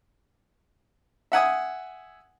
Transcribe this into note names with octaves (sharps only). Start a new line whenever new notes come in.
E5 F#5 G#5 D#6